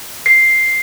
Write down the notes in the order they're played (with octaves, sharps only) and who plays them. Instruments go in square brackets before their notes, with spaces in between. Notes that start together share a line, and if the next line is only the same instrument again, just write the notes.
[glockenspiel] C7